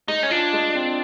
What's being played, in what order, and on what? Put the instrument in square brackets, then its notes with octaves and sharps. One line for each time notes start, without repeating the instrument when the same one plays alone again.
[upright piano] G#3 [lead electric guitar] D#4
[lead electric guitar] C#4
[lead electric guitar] D4 [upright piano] F4
[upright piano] G#3
C4